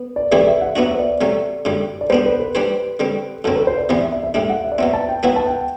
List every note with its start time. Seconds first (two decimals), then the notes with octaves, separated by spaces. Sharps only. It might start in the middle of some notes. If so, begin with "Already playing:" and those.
Already playing: B3
0.16 D5
0.31 C3 E3 A3 E4 G4 D5
0.47 E5
0.61 F#5
0.76 F#3 B3 D4 F#4 E5
0.94 C5
0.99 D5
1.21 C3 F#3 A3
1.65 F#2 D3 G3
2.01 D5
2.10 G3 B3 D4 C5
2.26 B4
2.40 B4
2.55 G3 D4 G4 C5
3.00 D3 G3 C4
3.44 F#2 D3 F#3 C4 A4
3.55 B4
3.67 C5
3.78 D5
3.89 C3 E3 B3 D5
4.00 E5
4.12 E5
4.23 E5
4.34 A2 G3 D4 E5
4.49 F#5
4.64 E5
4.72 D5
4.78 B2 F#3 C4 E5
4.93 A5
5.08 G5
5.23 F#3 B3 E4 B4 F#5
5.36 A5
5.46 G5